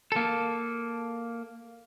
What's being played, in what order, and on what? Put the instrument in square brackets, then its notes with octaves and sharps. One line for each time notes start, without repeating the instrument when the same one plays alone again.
[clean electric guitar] A#3 A4